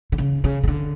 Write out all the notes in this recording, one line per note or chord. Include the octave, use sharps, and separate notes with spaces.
D3
C#3
C#3
C#3
D3